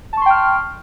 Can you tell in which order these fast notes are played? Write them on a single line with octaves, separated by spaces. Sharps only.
A5 C#6 C6 G5 F6